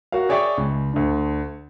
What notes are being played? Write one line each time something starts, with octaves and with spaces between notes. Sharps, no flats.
F#4 A#4 C#5 F5
G#4 C#5 D5 E5 G5 C#6
C#2
D2 D4